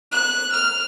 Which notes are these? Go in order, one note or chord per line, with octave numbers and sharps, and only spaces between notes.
F#6
F6